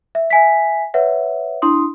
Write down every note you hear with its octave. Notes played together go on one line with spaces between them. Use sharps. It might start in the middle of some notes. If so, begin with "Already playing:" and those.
E5
E5 G#5 B6
B4 C#5 E5 F#5
D4 E4 C6 D#6